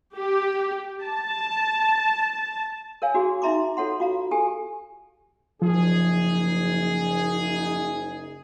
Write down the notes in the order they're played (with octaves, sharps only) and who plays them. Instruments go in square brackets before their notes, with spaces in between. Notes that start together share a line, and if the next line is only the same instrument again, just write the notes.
[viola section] G4
A5
[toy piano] A#4 C#5 F5 G#5
D4 F#4 G#4
D#4 E5 A#5 C6 D6
F4 A4 C#5 F#5 C6
F4 F#4 F5 A#5
G4 A4 G#5
[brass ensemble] F#1 D#4 G#4 [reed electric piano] F3